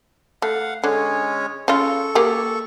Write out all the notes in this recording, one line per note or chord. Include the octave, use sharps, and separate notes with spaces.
A3 F5 F#5
D3 G#3 C#4 C#5
C#3 F4 A4 C#6
A#3 G4 G#4